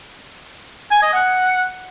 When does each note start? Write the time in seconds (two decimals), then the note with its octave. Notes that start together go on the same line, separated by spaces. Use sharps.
0.91 G#5
1.02 D#5
1.13 F#5